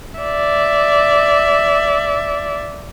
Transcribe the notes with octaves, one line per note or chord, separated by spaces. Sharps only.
D5 E5